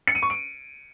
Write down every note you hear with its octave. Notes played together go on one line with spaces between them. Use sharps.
C#7
D#7
C#6
D7